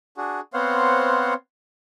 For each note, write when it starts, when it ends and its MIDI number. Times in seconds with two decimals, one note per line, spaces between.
0.17 0.40 62
0.17 0.40 66
0.17 0.40 68
0.54 1.34 59
0.54 1.34 60
0.54 1.34 72
0.54 1.34 73
0.54 1.34 77
0.54 1.34 78